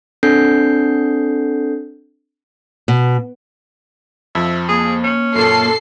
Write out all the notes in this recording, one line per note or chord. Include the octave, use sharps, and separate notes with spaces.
C4 D4 A4 G6 C7
B2
F2 F3 E5
A#3 G#4
C#4
F#2 A#2 A4 C7